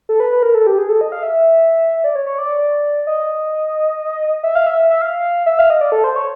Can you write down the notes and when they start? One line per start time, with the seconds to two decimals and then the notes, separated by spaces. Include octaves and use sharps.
0.09 A4
0.20 B4
0.32 B4
0.43 A#4
0.54 A4
0.67 G4
0.78 G#4
0.89 A4
1.01 D#5
1.12 F5
1.23 E5
2.04 D5
2.16 C#5
2.26 C#5
2.38 D5
3.07 D#5
4.43 E5
4.55 F5
4.67 E5
4.90 E5
5.02 F5
5.46 E5
5.59 F5
5.70 D#5
5.81 D5
5.92 A4
6.04 C5
6.16 C#5